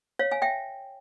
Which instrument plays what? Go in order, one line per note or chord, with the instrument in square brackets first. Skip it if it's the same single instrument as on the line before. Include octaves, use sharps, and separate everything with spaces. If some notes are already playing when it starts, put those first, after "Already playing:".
[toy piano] C#5 F5
F5 G#5
E5 G5